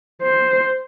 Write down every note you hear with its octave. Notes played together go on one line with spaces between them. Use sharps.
C5